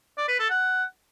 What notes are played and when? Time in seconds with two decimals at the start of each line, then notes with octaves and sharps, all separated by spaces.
0.18 D5
0.28 B4
0.39 A4
0.50 F#5